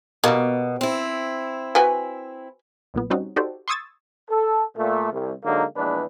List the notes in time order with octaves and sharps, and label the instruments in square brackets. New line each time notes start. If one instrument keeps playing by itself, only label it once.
[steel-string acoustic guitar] B2 [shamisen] G3 A#3
[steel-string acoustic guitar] C4 E4
[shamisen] F#4 B4 G#5
[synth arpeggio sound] B1 A#2 B3
G3 C4 C#4 D#4 F#4
D#4 F#4 G4 A4 C5 D5
C6 C#6 D#6 E6 G#6 A6
[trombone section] A4
A#2 A3
C2
D3 F#3 G#3 A#3 D#4
A#1 E2 G#3 D4 B4